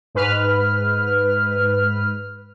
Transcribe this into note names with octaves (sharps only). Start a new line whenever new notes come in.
G#2 B4 F6